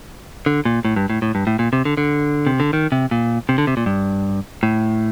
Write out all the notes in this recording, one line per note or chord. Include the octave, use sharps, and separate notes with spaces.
D3
A#2
A2
G2
A2
A2
G2
A2
A#2
C3
D3
D3
C3
D3
D#3
C3
A#2
C3
D3
C3
A#2
G2
A2